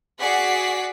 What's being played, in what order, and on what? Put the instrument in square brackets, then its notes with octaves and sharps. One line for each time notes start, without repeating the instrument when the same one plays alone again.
[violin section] F#4 G#4 D5 F#5 B6 C7